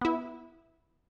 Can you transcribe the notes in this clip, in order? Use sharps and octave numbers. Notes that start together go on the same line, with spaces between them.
B3 E4